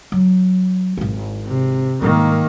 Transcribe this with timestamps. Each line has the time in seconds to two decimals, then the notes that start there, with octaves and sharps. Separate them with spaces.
0.12 F#3
0.97 G#1 E4
1.46 C3
2.02 G#2 D#3 G3 A#3